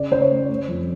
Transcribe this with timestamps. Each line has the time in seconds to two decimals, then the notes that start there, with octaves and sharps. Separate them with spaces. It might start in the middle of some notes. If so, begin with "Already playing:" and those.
Already playing: C#3 D5
0.11 C#3 C5
0.21 C#5
0.30 A3
0.49 A3
0.68 F2